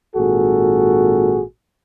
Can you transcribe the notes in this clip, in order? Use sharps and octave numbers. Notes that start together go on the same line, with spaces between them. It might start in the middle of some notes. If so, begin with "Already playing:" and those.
G#1 A#2 F#4 G#4 A4